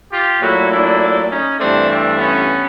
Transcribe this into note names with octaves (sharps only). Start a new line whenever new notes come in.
F4 G4
A#2 F#3 A3 E4 F#4
D4 E4
C#4 D#4
G2 E3 A3 C4 D4
C4 D4
B3 C#4